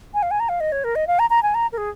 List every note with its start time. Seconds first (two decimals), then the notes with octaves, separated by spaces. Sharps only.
0.14 G#5
0.23 F5
0.31 G#5
0.40 A#5
0.49 F5
0.60 D#5
0.72 C#5
0.84 A#4
0.95 D#5
1.07 F5
1.19 A#5
1.30 A#5
1.43 G#5
1.54 A#5
1.72 A#4
1.78 G#4